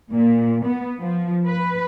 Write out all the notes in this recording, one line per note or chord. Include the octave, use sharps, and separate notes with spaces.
A#2
B3
F3
B4